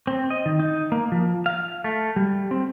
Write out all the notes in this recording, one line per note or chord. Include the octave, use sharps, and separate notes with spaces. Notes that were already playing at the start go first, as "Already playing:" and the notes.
C4
D#5
D#3
D#4
A#3
F3
F5
A3
G3
C4